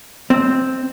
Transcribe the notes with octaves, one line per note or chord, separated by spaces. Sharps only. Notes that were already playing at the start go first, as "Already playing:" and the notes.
C4